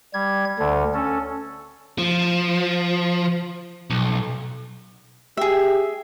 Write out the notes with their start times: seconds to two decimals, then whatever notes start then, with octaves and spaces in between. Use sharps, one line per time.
0.14 G3 G#6
0.59 D2 D3
0.94 C#4 A4
1.98 F3
3.90 B1
5.37 G4 G#4 E5